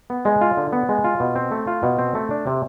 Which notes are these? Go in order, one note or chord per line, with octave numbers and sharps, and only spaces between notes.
B3
G#3
F4
D3
B3
G#3
F4
B2
C4
A3
F4
B2
C4
A3
D4
C3